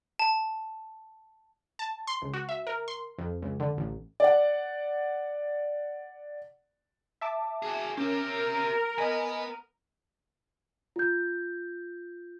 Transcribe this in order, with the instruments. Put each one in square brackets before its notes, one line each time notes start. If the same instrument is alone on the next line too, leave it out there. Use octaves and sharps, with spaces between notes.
[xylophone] A5
[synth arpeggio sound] A5
C6
C#2
F#4
E5
A#4
C6
F2
C#2
D3
A1
[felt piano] D5 F#5
[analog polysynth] E5 A5 D6
[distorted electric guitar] F#4 G#4
[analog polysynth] C#4 [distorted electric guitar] G4 E5 [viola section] A#4
[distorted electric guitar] B3 [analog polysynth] D#5 G#5
[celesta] F4 G6